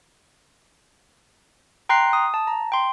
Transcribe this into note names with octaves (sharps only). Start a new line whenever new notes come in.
G5 A#5 C6 F#6 C7
D#6
A5
A#5
G5 C6